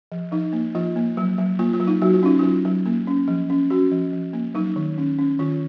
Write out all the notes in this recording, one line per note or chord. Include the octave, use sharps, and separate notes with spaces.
F3
F3 D#4
A#3
F3 F4
A#3
F#3
F#3
A#3 F4
F4
F#3
D#4
F#3 F#4
F4
C#4 D#4
F#3 F4
F#3
A#3
C#4
F3
C#4
C#4 F#4
F3
F3
A#3
F#3 D#4
D#3
C#4
C#4
D#3 F4